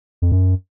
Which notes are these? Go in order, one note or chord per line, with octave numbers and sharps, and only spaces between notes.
F2
F#2